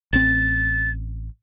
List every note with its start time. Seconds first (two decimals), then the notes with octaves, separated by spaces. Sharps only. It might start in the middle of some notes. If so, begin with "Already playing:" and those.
0.13 A1 C4 A6